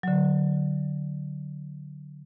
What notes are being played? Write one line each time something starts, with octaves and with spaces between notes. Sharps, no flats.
D3 F#3